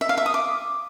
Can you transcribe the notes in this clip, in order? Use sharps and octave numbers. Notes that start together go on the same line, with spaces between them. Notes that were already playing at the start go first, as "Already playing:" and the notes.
E5
F5
E5
D#6
D6